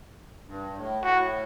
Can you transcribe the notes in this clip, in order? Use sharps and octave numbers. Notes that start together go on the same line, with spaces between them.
G2
A2
A2 F#4